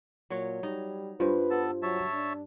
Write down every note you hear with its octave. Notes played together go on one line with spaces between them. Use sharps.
A#2 F#3 C#5
G3 D#4
G2 F4 B4 C5
B3 A4 A5
F#3 C#5 E5 A5
D4